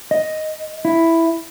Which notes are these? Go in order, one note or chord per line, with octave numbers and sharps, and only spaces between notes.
D#5
E4